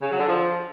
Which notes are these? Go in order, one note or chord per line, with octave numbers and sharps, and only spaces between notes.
C#3
F#3
D3
F3